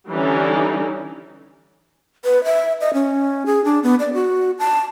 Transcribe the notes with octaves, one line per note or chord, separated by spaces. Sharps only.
D3 E3 G3 C#4 D#4
B4
E5
D#5
C#4
G#4
D4
B3
D5
F#4
A5